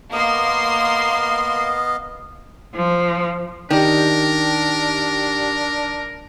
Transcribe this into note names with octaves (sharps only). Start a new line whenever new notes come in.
A#3 B3 D#5 F5 C6 C7
F3
D#3 D4 G4 A#4 D5 G5